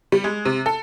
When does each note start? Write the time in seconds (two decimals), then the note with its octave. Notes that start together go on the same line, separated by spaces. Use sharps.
0.12 G3
0.24 G#3
0.45 C3
0.66 A4